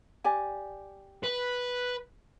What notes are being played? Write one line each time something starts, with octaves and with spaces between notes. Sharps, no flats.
G4 D5 G#5
B4